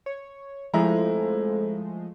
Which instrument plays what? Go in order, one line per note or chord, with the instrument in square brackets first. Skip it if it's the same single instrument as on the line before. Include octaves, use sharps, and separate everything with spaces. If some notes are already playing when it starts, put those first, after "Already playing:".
[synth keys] C#5
[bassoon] F2 [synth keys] F3 G#3 A3 [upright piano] E4 A#5